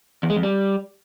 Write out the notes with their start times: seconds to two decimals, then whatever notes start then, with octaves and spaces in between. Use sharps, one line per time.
0.23 E2
0.30 G#3
0.37 F2
0.43 G3